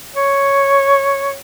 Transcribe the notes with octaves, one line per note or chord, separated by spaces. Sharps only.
C#5